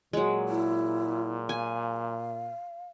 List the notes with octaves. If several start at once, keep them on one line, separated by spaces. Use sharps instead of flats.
A#2 F#3 G#3
E4
F5 G#5